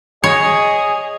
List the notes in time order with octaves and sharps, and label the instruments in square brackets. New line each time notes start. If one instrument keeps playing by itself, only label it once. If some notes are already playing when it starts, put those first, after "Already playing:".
[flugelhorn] G#4 [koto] C#5 [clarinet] D#5